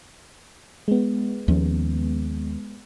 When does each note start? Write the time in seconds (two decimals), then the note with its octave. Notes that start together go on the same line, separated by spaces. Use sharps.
0.88 G#3 B3
1.48 D#2 F3 C#4